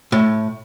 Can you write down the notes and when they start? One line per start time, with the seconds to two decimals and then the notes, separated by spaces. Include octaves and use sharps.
0.12 A2